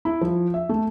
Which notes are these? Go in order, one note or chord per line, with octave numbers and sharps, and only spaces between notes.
E4
F3
E5
A3